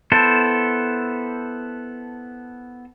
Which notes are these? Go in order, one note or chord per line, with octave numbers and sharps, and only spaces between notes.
B3 E4 A4 C5